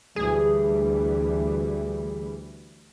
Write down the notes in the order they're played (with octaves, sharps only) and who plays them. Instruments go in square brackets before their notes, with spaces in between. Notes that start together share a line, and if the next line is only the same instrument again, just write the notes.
[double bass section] D2 E3 G3 [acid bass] G#4